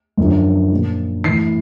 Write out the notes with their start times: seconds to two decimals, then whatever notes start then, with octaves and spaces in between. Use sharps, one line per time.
0.18 F#2 D3 F3
0.72 A#2 F3
1.24 A2 E3 C7